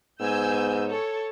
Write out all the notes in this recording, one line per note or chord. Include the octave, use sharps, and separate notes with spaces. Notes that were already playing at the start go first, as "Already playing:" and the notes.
G#2 B3 G#5 E6 G6
A4 C#5